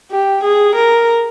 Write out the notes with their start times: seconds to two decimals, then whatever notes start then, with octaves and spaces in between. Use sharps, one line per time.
0.11 G4
0.44 G#4
0.75 A#4